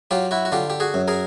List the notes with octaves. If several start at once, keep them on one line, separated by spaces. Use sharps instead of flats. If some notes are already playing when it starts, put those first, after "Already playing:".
F#3 F4 G4
E4 F#4
F#4
D3 F4 G4
G4
F#4 G#4
F#2
G#4 A#4